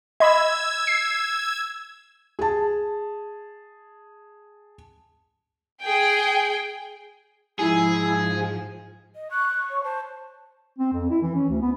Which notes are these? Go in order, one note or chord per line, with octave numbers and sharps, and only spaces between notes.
D#5 B5 E6 G#6
C7
G#4 A5
G#4 G5
G#2 F3 E4 G#4
D#5
C#6 F#6
C#5
C5 A5
C4
F2
E4
E3
C#4
D2
B3